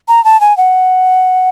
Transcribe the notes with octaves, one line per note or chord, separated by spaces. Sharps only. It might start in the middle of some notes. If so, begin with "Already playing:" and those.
A#5
A5
G#5
F#5